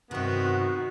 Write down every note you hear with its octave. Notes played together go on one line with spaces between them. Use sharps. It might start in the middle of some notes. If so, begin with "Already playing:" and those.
G2 C3 D#3 B3 C4 F#4